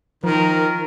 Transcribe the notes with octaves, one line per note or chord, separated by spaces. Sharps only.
D#3 F3 A#4